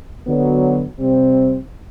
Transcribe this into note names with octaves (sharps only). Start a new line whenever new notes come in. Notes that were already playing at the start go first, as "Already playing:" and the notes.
D3 F#3 B3
C3 G3 C4